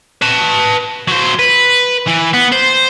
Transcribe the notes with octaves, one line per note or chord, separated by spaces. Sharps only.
B4 A5
F#3 C5
B4
E3
B3
C5